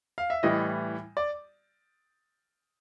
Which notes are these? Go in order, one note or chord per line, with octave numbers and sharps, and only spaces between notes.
F5
E5
A2 E3 G3 D#5
D5